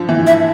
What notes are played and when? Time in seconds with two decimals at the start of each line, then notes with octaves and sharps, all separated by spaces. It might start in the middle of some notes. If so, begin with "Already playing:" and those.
Already playing: D3 F3
0.09 E3
0.27 E5